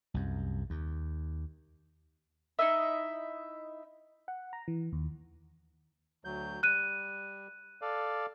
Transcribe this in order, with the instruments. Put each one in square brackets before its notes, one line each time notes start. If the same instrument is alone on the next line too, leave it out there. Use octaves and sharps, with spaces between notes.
[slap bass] C2 F#2
D#2
[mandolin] D#4 E4 D#5 E5
[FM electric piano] F#5
A#5
E3
D#2
[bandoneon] D2 F#3 G6
[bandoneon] G3 [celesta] F#6 D#7
[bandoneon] A4 D5 F5